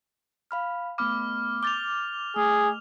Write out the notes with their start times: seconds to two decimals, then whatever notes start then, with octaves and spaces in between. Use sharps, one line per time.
0.51 F5 B5 F6
0.98 A3 B3 B5 D6 F6
1.63 D6 G6 A6 F7 G7
2.36 A3 G#4